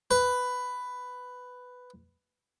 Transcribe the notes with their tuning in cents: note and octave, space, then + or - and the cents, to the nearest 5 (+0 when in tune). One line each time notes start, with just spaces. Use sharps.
B4 +10